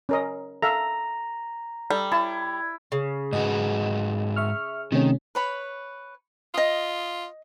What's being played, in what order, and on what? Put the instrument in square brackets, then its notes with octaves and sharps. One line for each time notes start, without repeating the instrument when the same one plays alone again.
[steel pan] C#4 A#4 D#5
[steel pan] A4 E5 F5 [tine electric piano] A#5
[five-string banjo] G3 [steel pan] A4
[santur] E4 [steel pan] A5
[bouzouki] C#3
[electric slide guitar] G#2 F#4 B4 [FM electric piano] D#5
[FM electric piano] E5 C#6 F6
[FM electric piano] C3 A3 C#4 [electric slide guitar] D#3
[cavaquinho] B4 C#5 B5
[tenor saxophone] F4 [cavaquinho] D#5 D#6